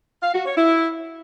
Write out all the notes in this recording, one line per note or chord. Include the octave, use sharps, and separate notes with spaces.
F5
F#4
C#5
E4